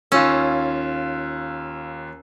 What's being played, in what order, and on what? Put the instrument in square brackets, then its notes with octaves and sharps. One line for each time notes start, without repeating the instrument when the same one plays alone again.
[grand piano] D#2 F4 E6 [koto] C#4